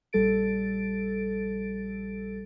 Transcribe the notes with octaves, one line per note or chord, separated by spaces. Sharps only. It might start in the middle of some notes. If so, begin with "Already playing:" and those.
A#1 G3 A4 A6 D7